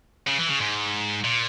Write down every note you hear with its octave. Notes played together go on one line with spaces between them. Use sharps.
C#3
E3
C#3
G#2
A#2